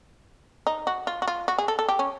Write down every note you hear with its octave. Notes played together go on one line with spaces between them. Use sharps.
D#4
F#4
F4
F#4
F4
F#4
G#4
A4
A4
G4
C#4